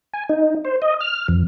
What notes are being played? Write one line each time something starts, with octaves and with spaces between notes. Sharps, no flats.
G#5
D#4
C5
D#5
F6
F2